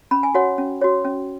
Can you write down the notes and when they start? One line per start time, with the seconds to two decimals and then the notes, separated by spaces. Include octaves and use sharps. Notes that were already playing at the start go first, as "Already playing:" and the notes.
0.11 C#4 B5
0.23 G#5
0.34 F#4 C#5 F#5
0.58 C#4
0.81 F#4 C#5
1.05 C#4